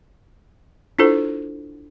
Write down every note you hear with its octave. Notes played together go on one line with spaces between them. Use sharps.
D4 E4 F4 A4 C5